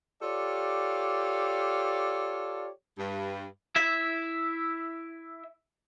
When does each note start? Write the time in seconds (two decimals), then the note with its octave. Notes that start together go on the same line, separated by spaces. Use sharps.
0.21 F4 G4 A4 C#5 D5 F5
2.98 G2
3.76 E4 E5